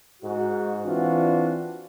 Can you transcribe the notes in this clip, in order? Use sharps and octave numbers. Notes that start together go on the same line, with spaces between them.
G#2 F#4
E3 C4 D4 F4 F#4